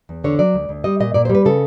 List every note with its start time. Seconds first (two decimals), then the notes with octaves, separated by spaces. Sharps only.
0.09 E2
0.24 D3 C#5
0.39 F#3 D5
0.54 D2
0.69 D2
0.84 G3 D#5
1.00 A#2 D#5
1.14 A#2 D5
1.25 C5
1.30 G3
1.35 B4
1.45 C#3 A4